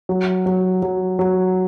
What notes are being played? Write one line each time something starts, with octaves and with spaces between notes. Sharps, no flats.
F#3
F#3
F#3
F#3